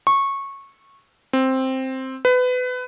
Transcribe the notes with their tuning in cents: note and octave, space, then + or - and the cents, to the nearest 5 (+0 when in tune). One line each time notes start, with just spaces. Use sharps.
C#6 -15
C4 +5
B4 +25